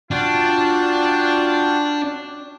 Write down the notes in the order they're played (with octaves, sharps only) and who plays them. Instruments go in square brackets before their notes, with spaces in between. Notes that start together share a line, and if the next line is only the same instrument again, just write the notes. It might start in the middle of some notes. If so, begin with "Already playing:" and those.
[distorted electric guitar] D4 [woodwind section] F4 [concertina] F#4 G5 A5